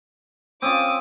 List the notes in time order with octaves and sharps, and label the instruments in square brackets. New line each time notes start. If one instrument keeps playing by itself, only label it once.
[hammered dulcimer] C4 C#4 F4 [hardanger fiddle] D6 D#6